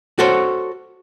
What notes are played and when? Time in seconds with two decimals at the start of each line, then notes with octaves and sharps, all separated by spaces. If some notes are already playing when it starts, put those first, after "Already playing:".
0.19 F#4 A4 C5 C#5